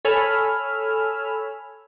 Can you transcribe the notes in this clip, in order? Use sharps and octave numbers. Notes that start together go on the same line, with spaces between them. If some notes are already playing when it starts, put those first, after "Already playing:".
A4 C#5 G#5 B5 E6 F6